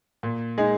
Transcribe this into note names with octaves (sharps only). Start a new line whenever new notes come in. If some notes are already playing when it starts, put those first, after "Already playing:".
A#2
G#3 D#4 G#4